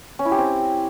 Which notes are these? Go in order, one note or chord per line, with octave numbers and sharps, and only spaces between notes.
C#4
E4
G4
C4